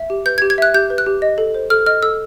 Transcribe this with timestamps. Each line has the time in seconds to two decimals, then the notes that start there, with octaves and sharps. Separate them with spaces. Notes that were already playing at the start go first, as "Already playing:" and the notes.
Already playing: E5
0.10 G4
0.26 B4 G6
0.38 G#6
0.42 G4
0.50 G#6
0.58 E5 F#6
0.74 G4 G6
0.90 B4
0.98 F#6
1.06 G4
1.22 D#5
1.38 A4
1.54 C5
1.70 A4 F6
1.86 D#5 F6
2.02 A4 E6